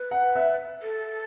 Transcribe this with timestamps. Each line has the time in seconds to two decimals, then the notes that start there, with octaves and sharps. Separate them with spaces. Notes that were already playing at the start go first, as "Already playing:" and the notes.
Already playing: B4
0.11 F#5
0.35 E5
0.83 A4